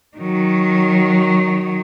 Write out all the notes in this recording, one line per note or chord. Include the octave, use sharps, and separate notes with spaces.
D#3 F#3